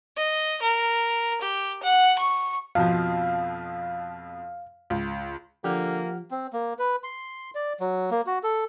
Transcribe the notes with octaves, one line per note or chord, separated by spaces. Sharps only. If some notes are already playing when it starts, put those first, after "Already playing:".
D#5
A#4
G4
F#5
C#6
F2 B2 F3 F5
C#2
D3 F3 A#3 G4 F#5 F6
C4
A#3
B4
C6
D5
F#3
A#3
F#4
A4